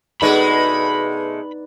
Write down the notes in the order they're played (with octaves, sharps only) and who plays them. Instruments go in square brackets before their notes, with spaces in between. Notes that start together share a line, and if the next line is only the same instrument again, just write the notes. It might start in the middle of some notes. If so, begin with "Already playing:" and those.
[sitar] B2 G#3 A3 [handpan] D#4 B4 D5 [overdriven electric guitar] B5